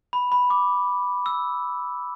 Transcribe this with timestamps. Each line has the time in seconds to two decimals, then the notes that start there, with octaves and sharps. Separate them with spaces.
0.13 B5
0.32 B5
0.50 D6
1.26 E6